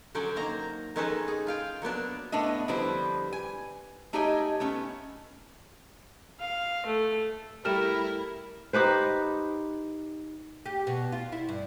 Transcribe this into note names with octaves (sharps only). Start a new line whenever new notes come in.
D3 F#3 C#4 C5 D5
D#3 A#3 C5 A#5
D#3 G#3 C#4 D#4 A4 B4
G#4
F4 F5 G5
F#3 A#3 B3 D4
A2 A3 B3 D4 D#5
D3 F3 G3 E4 B4 C5
G#5
A3 D#4 G4 C#5 D#5 G#5
A3 B3 C#4
F5
A3
G3 A3 E4 A#4 F6 E7
D#4 G4 B4 C5
G4
B2
F4
E4
G2